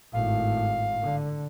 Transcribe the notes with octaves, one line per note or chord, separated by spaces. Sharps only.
G#1 A2 F5
D3